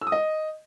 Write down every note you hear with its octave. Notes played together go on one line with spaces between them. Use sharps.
E6
D#6
D#5